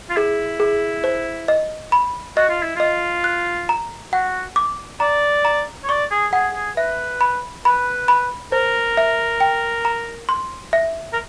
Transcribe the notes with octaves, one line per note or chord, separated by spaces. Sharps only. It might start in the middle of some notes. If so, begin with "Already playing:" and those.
F4
E4 G#4
G#4
C5
D#5
B5
F#4 D#5
F4
E4
F4 D#5
F#6
A#5
F#4 F#5
D6
D5 A#5
A#5
C#5
D5 C#6
G#4
G#4 F#5
G#4
B4 E5
B5
B4 B5
B5
A#4 C5
E5
G5
A#5
C6
E5
A#4